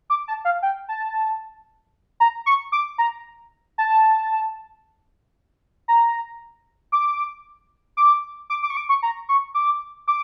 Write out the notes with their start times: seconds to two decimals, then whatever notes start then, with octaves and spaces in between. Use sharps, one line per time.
0.10 D6
0.28 A5
0.45 F5
0.63 G5
0.89 A5
2.20 A#5
2.46 C#6
2.72 D6
2.98 A#5
3.78 A5
5.88 A#5
6.92 D6
7.97 D6
8.50 D6
8.63 D6
8.70 C#6
8.77 D6
8.89 C#6
9.02 A#5
9.29 C#6
9.54 D6
10.07 D6